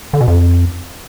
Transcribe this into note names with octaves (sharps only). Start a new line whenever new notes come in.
D3
B2
F2